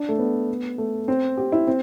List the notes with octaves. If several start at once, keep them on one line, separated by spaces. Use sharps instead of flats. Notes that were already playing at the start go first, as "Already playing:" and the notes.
Already playing: D4
A3
B3
A3
C4
G4
E4
C4